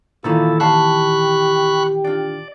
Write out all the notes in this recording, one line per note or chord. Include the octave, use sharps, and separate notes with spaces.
A#2 D#3 E3 E4 F4 A4
G4 D5 F5 A5 B5 C#6 F#6
D4 F4 D5